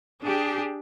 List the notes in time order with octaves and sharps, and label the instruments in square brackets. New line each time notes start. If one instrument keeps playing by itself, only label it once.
[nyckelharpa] D4 [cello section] G4 G#4